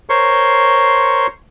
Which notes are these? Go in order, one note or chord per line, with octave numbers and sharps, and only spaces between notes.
A#4 C5 C#5 C6 C#6